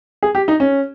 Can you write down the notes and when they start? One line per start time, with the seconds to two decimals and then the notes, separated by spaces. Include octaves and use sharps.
0.23 G#4
0.35 G4
0.48 D#4
0.60 C#4